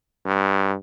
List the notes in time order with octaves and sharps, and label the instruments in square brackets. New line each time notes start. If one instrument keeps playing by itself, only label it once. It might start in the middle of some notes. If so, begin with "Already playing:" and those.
[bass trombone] G2